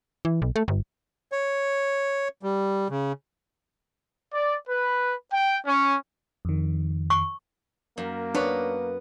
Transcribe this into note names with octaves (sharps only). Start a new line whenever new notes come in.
E3
B1
A3
G1
C#5
G3
C#3
D5
B4
G5
C#4
F2 D#3
C#6
F#2 A#3
B3 D4 B4 C#5 D5